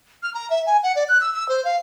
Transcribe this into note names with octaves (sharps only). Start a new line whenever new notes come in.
F6
A#5
E5
G#5
F#5
D5
F#6
E6
E6
C5
F5